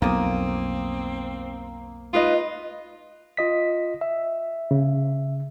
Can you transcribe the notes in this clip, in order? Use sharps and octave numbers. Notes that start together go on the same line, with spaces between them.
B1 F2 A#3 C4 D#6
D#4 F4 B4 D#5
F4 D#5 B6
E5
C#3